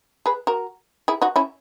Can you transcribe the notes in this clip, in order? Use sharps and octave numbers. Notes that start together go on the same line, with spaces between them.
G#4 B4
F#4 A#4
E4 G#4
D#4 F#4
C#4 E4